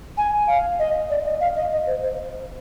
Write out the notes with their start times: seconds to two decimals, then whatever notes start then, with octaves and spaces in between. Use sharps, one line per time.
0.18 G#5
0.47 F5
0.79 D#5
1.10 D5
1.25 D#5
1.41 F5
1.56 D#5
1.72 D#5
1.87 C5
2.03 C5